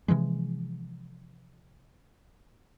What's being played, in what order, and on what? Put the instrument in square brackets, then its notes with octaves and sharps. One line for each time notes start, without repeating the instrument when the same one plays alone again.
[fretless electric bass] C3 E3 F3 G#3